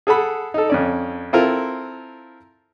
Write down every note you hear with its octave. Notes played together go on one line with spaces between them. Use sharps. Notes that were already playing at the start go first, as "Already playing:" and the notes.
G#4 A4 F#5 B5
D#4 A4
F2 C#4 D5
C4 E4 F4 A4 A#4